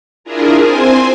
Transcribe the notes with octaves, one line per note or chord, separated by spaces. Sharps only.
D4 E4 F4 G#4 A#4
C4 C5 G#5 C6